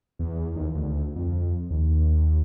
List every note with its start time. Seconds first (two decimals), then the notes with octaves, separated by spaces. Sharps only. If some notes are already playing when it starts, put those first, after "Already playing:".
0.19 E2
0.56 D#2
0.75 D2
1.16 F2
1.70 D#2